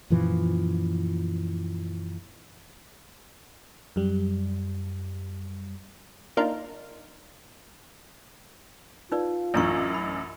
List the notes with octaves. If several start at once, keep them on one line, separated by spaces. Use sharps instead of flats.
F#2 A#2 E3 F3
F#2 G3
A#3 D4 D#4 F4 A#4
D#4 F4 B4 D5
A1 F#2 D4 A#5 C#6
B5